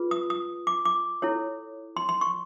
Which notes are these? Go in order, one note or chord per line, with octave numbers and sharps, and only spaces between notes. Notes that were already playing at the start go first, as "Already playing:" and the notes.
Already playing: F4 G#4 B4
D#6
D#6
D6
D6
E4 A4 C#5
C6
C6
C#6